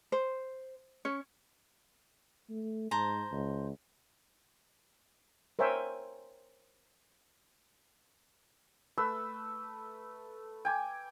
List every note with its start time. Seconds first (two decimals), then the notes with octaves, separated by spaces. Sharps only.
0.12 C5
1.05 C#4 C#5
2.49 A3
2.91 G#2 C5 A5 A#5
3.31 C#2
5.59 A#4 C5 C#5 E5 G5 G#5
8.98 A3 B4 E5 E6
10.65 G5 G#5 D6